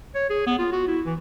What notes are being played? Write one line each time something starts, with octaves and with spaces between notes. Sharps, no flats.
C#5
G#4
B3
F4
F#4
E4
E3